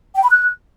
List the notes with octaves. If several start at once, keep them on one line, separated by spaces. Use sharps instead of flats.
G5
B5
F#6